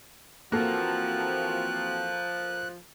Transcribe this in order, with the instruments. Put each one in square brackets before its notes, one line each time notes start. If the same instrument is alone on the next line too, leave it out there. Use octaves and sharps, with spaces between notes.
[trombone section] E3 C4 F#4 [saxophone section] F3 [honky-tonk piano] A#3 A4 A#4 [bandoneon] F#6